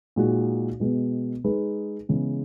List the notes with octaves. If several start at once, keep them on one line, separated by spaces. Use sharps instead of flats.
A#2 G#3 D#4 F#4
B2 G#3 B3
G#3 D#4 G#4 B4
C#3 E3 G#3 B3